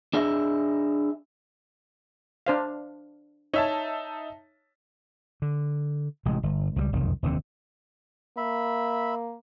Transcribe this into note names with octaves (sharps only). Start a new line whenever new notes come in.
D4 G#4 D#5 E5
D4 C5 F5
D#4 C#5 E5 A5
D3
A1 C3 G#3
G1
C#2 F3 G3
F#1 C2 F2 D#3
F1 D#2 D3 C4
A#3 E5 B5